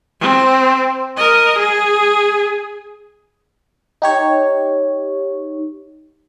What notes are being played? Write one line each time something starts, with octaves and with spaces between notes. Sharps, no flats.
C4
A#4 D#5
G#4
D#4 G4 C#5